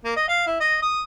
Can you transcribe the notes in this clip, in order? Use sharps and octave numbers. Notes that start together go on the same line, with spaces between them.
A#3
D#5
F5
E4
D#5
D#6